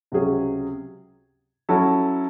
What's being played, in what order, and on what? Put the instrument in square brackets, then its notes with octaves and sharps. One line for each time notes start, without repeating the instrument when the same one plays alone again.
[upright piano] C#2 C3 F#3 C#4 G#4
F#3 C#4 E4 A4